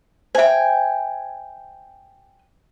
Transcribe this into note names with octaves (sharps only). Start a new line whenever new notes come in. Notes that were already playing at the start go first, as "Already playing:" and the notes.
C5 E5 G5 G#5